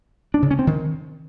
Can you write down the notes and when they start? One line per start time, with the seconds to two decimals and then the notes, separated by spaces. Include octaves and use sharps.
0.34 D4
0.42 C#3
0.51 C#4
0.59 C4
0.67 D#3